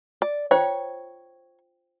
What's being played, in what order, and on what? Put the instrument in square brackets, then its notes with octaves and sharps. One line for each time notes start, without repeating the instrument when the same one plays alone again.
[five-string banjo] D5
[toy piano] F4 C5 G5 [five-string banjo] C#5